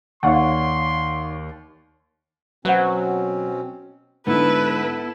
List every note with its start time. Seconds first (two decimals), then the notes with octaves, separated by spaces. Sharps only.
0.23 D#2 D#4 C#5 D5 F5 F#5 C6 C#6
2.65 B2 F#3 C4 C#4 B4 C5 F#5
4.27 G#2 D3 B3 E4 A4 B4